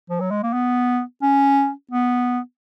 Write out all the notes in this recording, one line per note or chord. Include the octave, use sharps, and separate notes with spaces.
F3
F#3
G#3
A#3
B3
C#4
B3